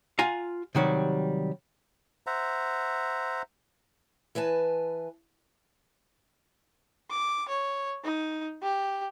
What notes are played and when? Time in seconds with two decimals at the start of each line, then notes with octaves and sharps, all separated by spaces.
0.19 F4 F#5 G#5 A#5
0.75 C3 D#3 F#3 G3
2.27 C5 E5 F#5 A#5
4.35 E3 B4 G#5 A5
7.10 D6
7.49 C#5
8.04 D#4
8.63 G4